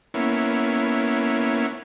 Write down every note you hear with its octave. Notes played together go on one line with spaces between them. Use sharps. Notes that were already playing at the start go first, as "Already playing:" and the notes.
A#3 B3 C#4 E4